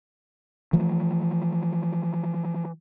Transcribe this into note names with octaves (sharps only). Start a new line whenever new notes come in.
E3 F3 A3